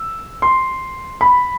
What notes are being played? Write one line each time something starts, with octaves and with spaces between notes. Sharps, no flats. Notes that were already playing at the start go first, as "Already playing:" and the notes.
Already playing: E6
C6
B5